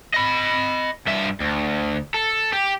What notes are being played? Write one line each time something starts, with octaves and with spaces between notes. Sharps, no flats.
D#5 B5
G2 E5
D2
A4
G4